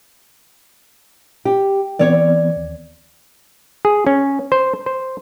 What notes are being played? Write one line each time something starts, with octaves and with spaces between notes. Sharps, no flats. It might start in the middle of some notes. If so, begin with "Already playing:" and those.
G4
E3 B3 C4 C#5 D5
D#2
G#4
C#4
C5
C5